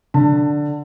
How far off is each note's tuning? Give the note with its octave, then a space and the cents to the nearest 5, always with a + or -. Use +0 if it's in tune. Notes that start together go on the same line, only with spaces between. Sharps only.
D3 +5 A5 +25